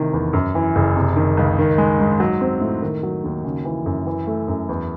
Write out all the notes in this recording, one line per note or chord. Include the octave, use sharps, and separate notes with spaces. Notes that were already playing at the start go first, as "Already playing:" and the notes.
Already playing: A1 C3 D#3
E2
F#2
E3
F#1
C3
D#3
C#2
D#3
G#3
G#2
F#3
C4
A2
D#3
F#3
D#2
C#3
E3
F#2
E3
A3
F#2
E2